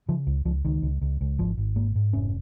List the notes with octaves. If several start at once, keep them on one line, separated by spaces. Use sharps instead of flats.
C#3 F3
C#2
C#2 F3
C#2 D#3
C#2
C#2
C#2
G#1 F3
G#1
G#2 A#3
G#2
F1 C#4